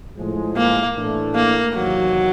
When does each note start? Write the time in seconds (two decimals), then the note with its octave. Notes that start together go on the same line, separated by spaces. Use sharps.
0.18 A2 F3 G#3
0.57 A#3
0.96 A2 E3 A3 D4
1.35 A#3
1.75 E2 C3 D#3 F#3